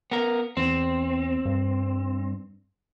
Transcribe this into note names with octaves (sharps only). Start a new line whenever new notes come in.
B3 A#4
E2 C4
G2